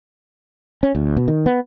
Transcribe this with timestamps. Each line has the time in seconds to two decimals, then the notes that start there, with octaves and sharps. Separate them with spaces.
0.83 C#4
0.95 D2
1.17 B2
1.28 D#3
1.46 B3